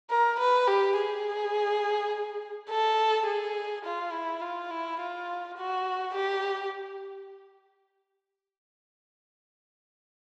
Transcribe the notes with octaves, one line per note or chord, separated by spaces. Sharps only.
A#4
B4
G4
G#4
A4
G#4
F4
E4
F4
E4
F4
F#4
G4